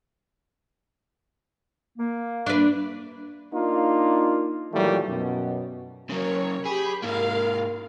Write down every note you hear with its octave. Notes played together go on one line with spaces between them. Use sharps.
A#3
D4 B4
A#3 D4 D#4 F4
A#2 D#3 E3 F#3 G3 A3
F#2 B2
C#3 F#3 A#4 C#5
G4 G#4 B5
G#2 A#3 A#4 F5